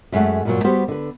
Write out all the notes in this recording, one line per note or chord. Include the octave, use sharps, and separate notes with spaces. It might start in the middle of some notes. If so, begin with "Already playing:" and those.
F#2 G#3 A3 E5 F#5 A5
G2 A#2 F#3
G3 B3 F#4 G4 C5
D3 B4